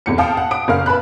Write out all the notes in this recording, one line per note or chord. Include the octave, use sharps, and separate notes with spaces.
F1 E2 C#7
F5 G5 A5 D#6
F#5
D#6 D7
F#1 A#4 F5 F6
B4 A5 B5 F#6